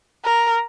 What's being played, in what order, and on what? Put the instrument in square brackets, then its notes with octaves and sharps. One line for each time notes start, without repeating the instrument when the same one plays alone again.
[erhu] A#4